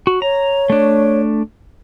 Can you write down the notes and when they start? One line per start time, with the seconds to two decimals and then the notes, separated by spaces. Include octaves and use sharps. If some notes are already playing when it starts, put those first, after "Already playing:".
0.07 F#4
0.22 C#5 A#5
0.70 A3 D4